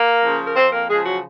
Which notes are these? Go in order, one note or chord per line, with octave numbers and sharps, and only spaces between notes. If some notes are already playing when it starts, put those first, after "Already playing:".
Already playing: A#3 A#4
C#3 F3
A#4
F2 C4 C5
A#3 A#4
C#3 F3 G#3 G#4
F#3 F#4